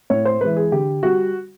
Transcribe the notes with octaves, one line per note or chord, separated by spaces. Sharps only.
A2 C#5
C5
E3 G#3 B4
G#4
D3 G4
G3 F#4